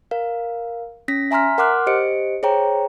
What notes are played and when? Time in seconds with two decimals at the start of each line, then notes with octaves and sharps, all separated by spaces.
0.11 A#4 F5
1.08 C#4 A#6 B6
1.31 E5 G#5 A#5 C6 F6 B6
1.58 A#4 F#5 C6 D6 F6 F#6
1.87 G4 C5 D#5 C#7 D7
2.43 G#4 C5 C#5 G5 A#5